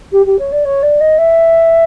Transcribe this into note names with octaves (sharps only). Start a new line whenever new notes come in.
G4
G4
C#5
D5
C#5
D5
D#5
E5